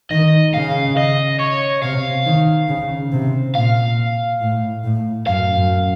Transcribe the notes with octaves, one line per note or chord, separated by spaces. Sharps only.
D#3 D#5
C#3 F5
D#5
C#5
C3 F5
D#3
C#3
C3
A#2 F5
A2
A2
F#2 F5
F#2